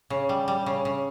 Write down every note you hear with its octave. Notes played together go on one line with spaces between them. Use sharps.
C#3
G3
G3
C#3
C#3